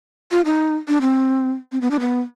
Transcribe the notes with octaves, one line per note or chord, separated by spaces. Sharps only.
F4
D#4
D4
C4
C4
B3
D4
B3